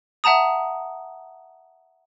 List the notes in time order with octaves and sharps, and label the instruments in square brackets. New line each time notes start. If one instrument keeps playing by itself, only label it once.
[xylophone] E5 F#5 A5 A#5 D#6